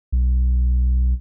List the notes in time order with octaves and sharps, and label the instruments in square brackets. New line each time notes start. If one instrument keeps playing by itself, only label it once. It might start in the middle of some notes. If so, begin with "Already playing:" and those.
[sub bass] B1